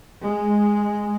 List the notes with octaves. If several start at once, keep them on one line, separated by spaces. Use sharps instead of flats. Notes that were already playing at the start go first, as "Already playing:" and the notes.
G#3